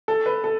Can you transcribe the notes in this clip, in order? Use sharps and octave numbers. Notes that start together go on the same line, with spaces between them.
A4
B4
A4